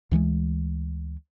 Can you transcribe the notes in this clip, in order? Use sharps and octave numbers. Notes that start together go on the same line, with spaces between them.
D2 E3 F#3 G#3